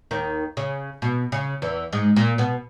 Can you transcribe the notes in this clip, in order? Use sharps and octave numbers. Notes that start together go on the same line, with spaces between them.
D#2 D#3
C#3
B2
C#3
E2 E3
G#2 G#3
A#2 A#3
B2 B3